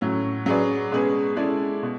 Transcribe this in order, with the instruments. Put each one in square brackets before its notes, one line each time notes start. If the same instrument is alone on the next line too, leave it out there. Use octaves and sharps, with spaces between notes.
[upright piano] A2 F#3 C#4
F#3 C#4 G#4 B4 D5
B2 G#3 C#4 G#4 B4
G#3 C#4 E4 A4 D5
B2